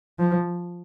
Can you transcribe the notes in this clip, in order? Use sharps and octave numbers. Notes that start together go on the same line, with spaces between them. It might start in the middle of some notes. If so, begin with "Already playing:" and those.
F3